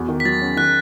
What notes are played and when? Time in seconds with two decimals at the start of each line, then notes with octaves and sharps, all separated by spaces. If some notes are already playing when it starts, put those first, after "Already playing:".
Already playing: E2 F#4
0.08 D#3
0.20 B6
0.25 F#3 A6
0.42 C#4
0.57 D#3 F#6